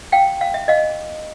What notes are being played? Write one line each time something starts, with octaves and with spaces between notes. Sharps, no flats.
F5 G5
F5
E5
D#5 F5